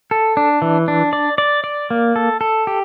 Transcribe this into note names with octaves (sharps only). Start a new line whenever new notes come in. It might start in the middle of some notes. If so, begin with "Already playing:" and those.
A4
D4
E3
D4
D5
D5
D5
A#3
A4
A4
G4